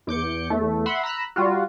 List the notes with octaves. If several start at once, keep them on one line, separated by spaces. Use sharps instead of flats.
E2 D6 G6 C#7
E2 A3
E5 F#5 B5 C6
A#5 B5 E6 F#6
G3 F4 F#4